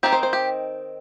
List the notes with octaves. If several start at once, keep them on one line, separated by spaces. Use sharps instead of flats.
D#3 C4 D#4 G4
C5
C5
G4